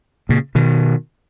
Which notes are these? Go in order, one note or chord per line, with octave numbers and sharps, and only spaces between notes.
A#2 C#3
B2 D#3